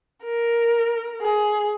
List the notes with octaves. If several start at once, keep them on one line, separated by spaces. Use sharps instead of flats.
A#4
G#4